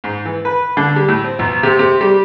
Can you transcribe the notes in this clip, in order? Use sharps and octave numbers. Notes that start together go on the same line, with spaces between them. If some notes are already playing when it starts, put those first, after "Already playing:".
G#2
E3
B4
D3
G3
A2
C4
B1
C3
C3
G3